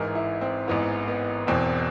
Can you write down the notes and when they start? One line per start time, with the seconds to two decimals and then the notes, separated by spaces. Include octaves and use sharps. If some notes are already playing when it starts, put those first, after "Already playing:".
Already playing: A1 G#2 E3 A#4
0.15 E4
0.41 C4
0.68 A1 G#2 E3 B3
1.08 B3
1.47 E1 E2 B2 C4